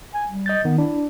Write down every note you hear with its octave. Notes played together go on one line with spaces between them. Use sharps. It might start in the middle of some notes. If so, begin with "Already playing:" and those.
G#5
G3
D#5 G6 A6
D#3 B3
D4 E4